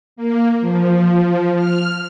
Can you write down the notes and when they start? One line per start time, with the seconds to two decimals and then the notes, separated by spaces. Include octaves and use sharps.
0.16 A#3
0.61 F3
1.23 F3
1.55 F6